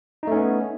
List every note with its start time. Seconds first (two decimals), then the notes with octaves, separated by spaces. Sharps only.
0.23 D#4
0.27 A3
0.32 C#4
0.36 B3